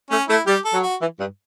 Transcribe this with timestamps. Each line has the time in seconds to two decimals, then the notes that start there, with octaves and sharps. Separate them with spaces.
0.10 A3 C#4
0.29 A3 E4
0.46 G3 G4
0.65 A4
0.73 F#3
0.83 F#4
1.01 E3
1.19 G2